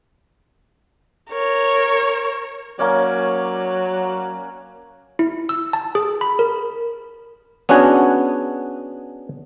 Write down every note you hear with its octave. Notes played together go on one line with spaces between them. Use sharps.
A#4 C#5
F#3 A#3 C#4 D5
E4
E6
A5
G#4
B5
A#4
B3 C#4 D4 F#4 G#4